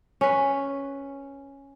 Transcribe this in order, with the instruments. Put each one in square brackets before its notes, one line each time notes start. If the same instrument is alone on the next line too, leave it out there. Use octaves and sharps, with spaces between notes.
[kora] C#4 B4